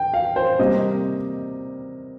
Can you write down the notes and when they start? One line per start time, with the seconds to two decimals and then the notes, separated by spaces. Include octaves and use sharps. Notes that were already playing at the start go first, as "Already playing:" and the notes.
Already playing: G5
0.14 F5
0.36 C5
0.59 C3 G3 A#3 D#5